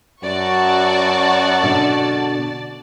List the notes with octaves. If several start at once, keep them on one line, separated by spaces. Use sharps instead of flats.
F#2 F#4 D5 A5 C#6 A6
B2 D3